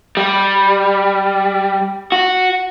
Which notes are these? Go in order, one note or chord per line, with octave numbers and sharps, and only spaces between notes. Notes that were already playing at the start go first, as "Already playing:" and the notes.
G3
F#4